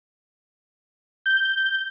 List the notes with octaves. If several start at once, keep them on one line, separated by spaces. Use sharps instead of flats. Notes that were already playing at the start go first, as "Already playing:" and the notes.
G6